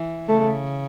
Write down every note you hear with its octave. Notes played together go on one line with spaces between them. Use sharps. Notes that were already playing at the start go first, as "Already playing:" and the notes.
Already playing: E3
C#3 A3